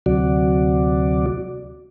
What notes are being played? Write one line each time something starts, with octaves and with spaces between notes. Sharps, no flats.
D2 C3 F#3 F#4 D5